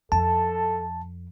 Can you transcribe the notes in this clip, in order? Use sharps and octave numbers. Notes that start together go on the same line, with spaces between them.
F2 A4 A5